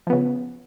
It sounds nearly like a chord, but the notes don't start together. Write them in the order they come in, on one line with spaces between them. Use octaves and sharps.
F3 B3 C#3